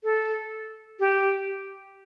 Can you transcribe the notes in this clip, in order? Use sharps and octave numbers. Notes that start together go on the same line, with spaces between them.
A4
G4